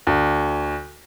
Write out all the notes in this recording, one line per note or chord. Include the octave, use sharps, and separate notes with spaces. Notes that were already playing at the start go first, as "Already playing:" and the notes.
D2